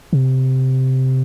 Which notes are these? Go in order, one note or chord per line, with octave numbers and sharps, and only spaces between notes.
C3